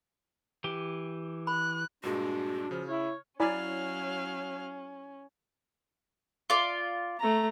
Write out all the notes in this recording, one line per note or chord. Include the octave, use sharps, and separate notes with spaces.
E3 G4
B5 F#6
G2 A#2 G#3 D4 F#4
C#3 F3 F6
E4 C#5
F#3 C#4 E4 D5 F5 G#5 B5
F4 D5
A3 A#5